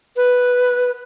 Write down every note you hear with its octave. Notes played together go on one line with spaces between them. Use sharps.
B4